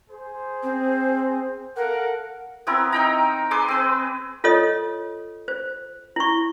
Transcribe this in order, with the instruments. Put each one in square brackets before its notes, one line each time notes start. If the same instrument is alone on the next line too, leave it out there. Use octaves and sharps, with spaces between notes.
[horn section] G#4 C5
[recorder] C4
[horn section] A4 F5 F#5 [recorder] A#4
[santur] B3 C4 E4 A#4
D#4 G5 A#5
G#4 B4 C6 D6
C4 B4
[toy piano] F4 A4 C#5 D#5 D#6
C5
E4 C#6